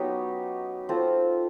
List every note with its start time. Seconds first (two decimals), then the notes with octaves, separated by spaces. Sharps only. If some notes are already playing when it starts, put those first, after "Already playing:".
Already playing: F#3 B3 C#4 D#4 G4
0.89 C4 F4 A4